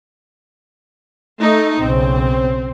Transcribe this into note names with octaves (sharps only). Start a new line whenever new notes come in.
A3 D#4
B1 C#3 C4